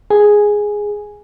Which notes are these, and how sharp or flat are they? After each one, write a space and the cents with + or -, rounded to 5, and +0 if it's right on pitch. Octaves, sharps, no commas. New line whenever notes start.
G#4 +0 G#5 -5